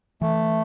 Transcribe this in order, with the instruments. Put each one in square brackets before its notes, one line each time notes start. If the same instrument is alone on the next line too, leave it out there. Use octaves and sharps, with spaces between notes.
[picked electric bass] E3 [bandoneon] A3